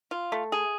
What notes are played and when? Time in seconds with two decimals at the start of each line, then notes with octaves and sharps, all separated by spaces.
0.11 F4
0.32 A3
0.52 G#4